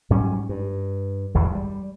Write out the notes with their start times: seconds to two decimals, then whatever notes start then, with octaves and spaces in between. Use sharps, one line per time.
0.10 G#2 F#3 G3 C#4
0.49 G2
1.34 G#1 E2 G2 G3
1.55 G3